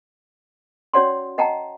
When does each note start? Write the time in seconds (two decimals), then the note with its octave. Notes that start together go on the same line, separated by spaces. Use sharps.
0.93 C#4 F#4 C#5 D5 F#5 C6
1.38 D#5 F#5 G5 A5 A#5